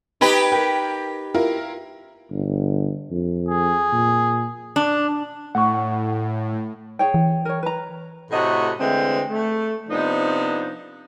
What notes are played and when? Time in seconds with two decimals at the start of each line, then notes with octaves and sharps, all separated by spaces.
0.21 D#4 G4 B4 G#6
0.52 A#4 G5
1.34 E4 F4 A#4
2.31 G1
3.11 F2
3.49 G#4
3.93 A#2
4.76 D4
5.55 A2 F#5 C#6
6.99 G#4 C#5 G5
7.14 E3
7.45 A#4 C#5
7.63 B4 A#5
8.31 A2 C3 A3 F#4 D#5 F#5
8.79 D3 E3 G#3 A3 C4
9.29 A3
9.88 C3 F3 B3 D4 D#4